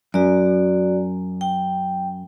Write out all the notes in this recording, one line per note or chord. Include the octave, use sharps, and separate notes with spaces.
F#2 F#4 D5
G5